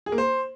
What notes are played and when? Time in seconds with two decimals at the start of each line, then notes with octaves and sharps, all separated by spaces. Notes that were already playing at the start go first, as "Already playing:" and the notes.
0.06 G#4
0.12 A#3
0.18 C5